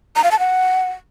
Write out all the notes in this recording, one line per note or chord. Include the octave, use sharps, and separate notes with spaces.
A#5
F5
A5
F#5